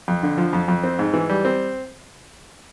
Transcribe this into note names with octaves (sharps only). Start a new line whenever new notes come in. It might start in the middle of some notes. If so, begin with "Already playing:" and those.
F2
D3
F3
F2
F2
C4
G#2
E3
G3
C4